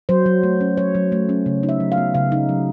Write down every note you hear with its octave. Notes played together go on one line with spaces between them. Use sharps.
F#3 C5
F#3
A3
C#4
F#3 C#5
F#3
A3
C#4
C#3
D#4
E5
F#3
F5
B3
C#3 F5
D#4
F#3